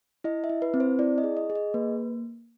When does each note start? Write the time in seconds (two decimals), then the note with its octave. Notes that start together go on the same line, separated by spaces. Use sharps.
0.24 E4 D#5
0.44 E5
0.49 E4
0.62 B4
0.74 C4
0.80 C5
0.99 E4 D5
1.18 D#5
1.24 G#4
1.37 D#5
1.50 G#4
1.55 D#5
1.74 A#3 B4